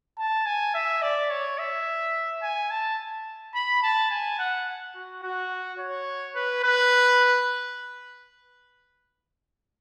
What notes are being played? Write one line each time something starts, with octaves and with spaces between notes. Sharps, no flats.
A5
G#5
E5
D5
C#5
E5
G#5
A5
B5
A5
G#5
F#5
F#4
F#4
C#5
B4
B4